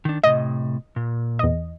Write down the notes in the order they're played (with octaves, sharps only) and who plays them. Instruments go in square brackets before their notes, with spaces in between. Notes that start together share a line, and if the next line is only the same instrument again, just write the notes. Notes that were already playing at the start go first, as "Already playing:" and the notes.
[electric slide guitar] D#3 D4
[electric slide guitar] A2 C3 [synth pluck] D#5
[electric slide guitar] A#2
[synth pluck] E2 D#5